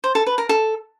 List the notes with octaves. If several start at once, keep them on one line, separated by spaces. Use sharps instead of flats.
C5
A4
B4
A#4
A4